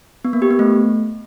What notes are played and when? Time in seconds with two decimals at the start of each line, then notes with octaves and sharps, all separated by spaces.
0.25 B3
0.33 A#3
0.42 G4
0.50 B3
0.59 A3